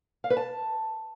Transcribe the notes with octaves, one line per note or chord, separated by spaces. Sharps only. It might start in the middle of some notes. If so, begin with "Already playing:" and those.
F5
B4
A5